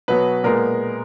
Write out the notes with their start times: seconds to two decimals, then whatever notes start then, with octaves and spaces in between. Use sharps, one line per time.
0.08 B2 F#3 B3 B4
0.44 A#2 G#3 B3 A#4